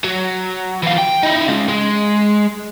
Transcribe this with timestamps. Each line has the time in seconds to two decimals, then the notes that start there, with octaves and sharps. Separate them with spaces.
0.04 F#3
0.83 E3 F4
0.98 G5
1.23 D#4 E4
1.48 C#3 G#3
1.68 G#3